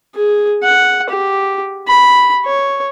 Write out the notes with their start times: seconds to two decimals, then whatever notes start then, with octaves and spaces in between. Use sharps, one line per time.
0.15 G#4
0.64 F#5
1.10 G4
1.88 B5
2.46 C#5